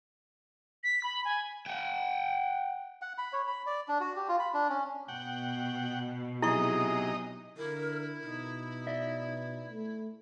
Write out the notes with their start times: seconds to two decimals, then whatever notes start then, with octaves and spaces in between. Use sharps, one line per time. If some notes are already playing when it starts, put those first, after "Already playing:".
0.84 B6
1.04 B5
1.25 G#5
1.66 F#5 G5
3.02 F#5
3.18 B5
3.33 C#5
3.48 B5
3.66 D5
3.88 D4
4.00 F#4
4.16 G4
4.28 F4
4.40 B5
4.54 D4
4.70 C#4
5.08 B2 F#5 G5
6.42 C3 F#3 D#4 E4 G#4 D#5 C#6
7.57 D3 E4 A#4
8.22 B2 D#4
8.87 D5 E5
9.68 A3